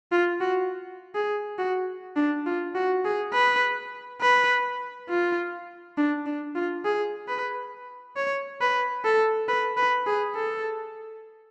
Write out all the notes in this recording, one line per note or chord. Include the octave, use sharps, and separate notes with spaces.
F4
F#4
G#4
F#4
D4
F4
F#4
G#4
B4
B4
F4
D4
D4
F4
G#4
B4
C#5
B4
A4
B4
B4
G#4
A4